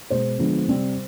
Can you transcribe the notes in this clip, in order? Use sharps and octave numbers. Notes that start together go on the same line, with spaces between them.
B2 G#3 B3 C5
D3 F3 G#3 B3
C3 G3 C4